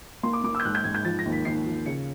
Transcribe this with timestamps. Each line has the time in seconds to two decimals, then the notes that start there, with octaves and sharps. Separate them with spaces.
0.23 A#3 C6
0.33 D6
0.44 A#3 D6
0.55 E6
0.60 G6
0.65 G#2 F#6
0.75 G6
0.84 G#2 G#6
0.95 G6
1.04 F3 A6
1.19 A#6
1.26 D#2
1.32 B6
1.45 D#2 C7
1.66 F3
1.86 C#3 C#7